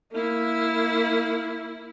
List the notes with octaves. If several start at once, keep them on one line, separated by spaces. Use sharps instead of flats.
A#3 E4